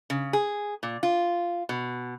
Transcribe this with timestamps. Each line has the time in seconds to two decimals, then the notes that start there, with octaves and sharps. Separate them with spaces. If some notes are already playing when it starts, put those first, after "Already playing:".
0.10 C#3
0.33 G#4
0.83 A#2
1.03 F4
1.69 B2